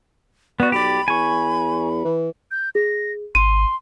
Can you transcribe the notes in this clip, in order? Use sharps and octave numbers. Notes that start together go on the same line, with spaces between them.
B3 F#4 D5
B1 G4 D5 B5
E2 G#5 C#6
E3
G6
G#4 A#6
G#1 C6 D#7